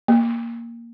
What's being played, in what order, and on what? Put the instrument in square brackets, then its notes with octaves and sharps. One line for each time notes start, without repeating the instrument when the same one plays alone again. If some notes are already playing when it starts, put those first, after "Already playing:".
[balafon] A#3